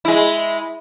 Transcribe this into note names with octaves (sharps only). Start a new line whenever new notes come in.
G#3 E4